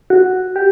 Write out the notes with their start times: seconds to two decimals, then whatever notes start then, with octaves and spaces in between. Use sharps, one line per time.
0.10 F#4
0.56 G4